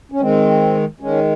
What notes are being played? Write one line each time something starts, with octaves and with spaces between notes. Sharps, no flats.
C#4
D#3 G#3 C4
D#3 G#3 C#4